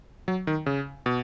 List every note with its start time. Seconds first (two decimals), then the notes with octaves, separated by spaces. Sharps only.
0.28 F#3
0.47 D#3
0.66 C#3
1.06 B2